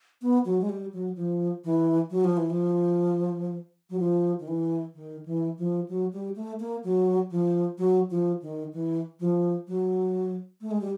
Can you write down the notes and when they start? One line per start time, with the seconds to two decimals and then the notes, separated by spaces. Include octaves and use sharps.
0.22 B3
0.45 F#3
0.61 G#3
0.69 G3
0.93 F#3
1.16 F3
1.64 E3
2.10 F#3
2.24 F3
2.37 E3
2.50 F3
3.90 F#3
3.99 F3
4.39 D#3
4.48 E3
4.95 D#3
5.25 E3
5.58 F3
5.88 F#3
6.13 G3
6.36 A3
6.60 A#3
6.83 F#3
7.30 F3
7.78 F#3
8.10 F3
8.42 D#3
8.73 E3
9.20 F3
9.67 F#3
10.61 A3
10.71 G#3
10.81 G3